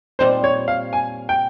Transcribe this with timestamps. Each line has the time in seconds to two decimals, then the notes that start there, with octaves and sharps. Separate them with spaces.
0.19 A#2 G3 C4 D#4 C5
0.44 C#5
0.68 F5
0.93 G#5
1.29 G5